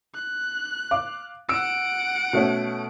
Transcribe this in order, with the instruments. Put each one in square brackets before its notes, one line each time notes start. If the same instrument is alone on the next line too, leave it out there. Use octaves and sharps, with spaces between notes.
[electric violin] F#6
[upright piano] F5 D6
[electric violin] F#5 D7 [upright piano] E6
[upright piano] B2 A3 C#4